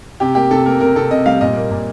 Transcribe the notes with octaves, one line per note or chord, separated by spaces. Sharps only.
C3 G4
A#3 G4
C3 A4
A#3 A#4
C3 A#4
C3 A4
C3 D#5
G3 F5
A#2 D#5
A#3
A#2